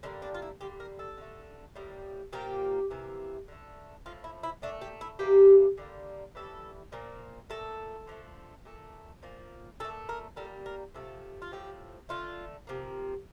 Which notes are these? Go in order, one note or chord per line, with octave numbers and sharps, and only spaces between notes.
D3 G3 A#3 D4
D4
F4
E4
D3 G3 A#3 G4
A#4
A4
D3 A3
A2 G3 A#3
A#2 F3 A#3 G4
C3 E3 A#3
D3 A3
A2 F3 A3 F4
E4
E4
A#2 A3 D4
G4
E4
C3 E3 G3 A#3 G4
D3 G3 A#3
A2 E3 G3 A4
A#2 F3 A#3
A#2 A3 A4
D3 F3 A3
A#2 A3
A#2 F3 A#3
A#2 A3 A4
A#4
A#2 G3 A#3 A4
A#4
C3 F3 A3 A4
F4
A2 F3 A3 G4
D3 A3 F4
C3 F3 A#3